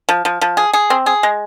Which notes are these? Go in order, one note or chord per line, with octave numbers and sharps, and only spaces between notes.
F3
F3
F3
G#4
G#4
C4
G#4
G#3